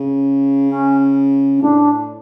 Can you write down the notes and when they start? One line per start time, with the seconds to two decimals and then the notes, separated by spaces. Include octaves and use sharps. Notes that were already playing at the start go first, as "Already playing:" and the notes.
Already playing: C#3
0.68 C#4
1.57 C#4
1.62 A2 D4